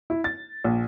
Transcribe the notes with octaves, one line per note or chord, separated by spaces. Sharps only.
E4
A6
A#1